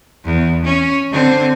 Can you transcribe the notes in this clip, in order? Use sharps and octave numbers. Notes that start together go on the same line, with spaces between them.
E2
C#4
D3 C4